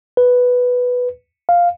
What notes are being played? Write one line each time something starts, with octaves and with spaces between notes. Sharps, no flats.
B4
F5